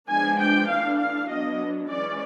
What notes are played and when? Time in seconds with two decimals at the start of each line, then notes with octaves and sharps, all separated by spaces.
0.09 F3 G#3 B3 D4 G#5
0.40 G5
0.69 E3 A3 D4 F5
0.99 F5
1.29 F#3 B3 D4 D#5
1.89 E3 G#3 C#4 D5